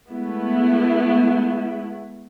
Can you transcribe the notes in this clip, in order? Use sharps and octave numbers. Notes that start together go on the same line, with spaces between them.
G#3 A3 B3 E4